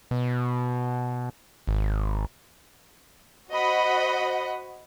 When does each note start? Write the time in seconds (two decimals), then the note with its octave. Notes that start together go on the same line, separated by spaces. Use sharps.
0.11 B2
1.67 G#1
3.51 F#4 C5 D#5 F#5 B5